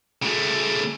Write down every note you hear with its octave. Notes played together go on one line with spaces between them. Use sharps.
C#3 A3